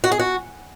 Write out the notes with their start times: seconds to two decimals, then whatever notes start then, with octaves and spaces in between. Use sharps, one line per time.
0.04 F#4
0.12 G#4
0.19 F#4